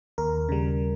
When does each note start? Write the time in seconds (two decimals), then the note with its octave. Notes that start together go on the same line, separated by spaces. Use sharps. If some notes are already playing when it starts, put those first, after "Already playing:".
0.18 D#2 A#4
0.49 C#3 G3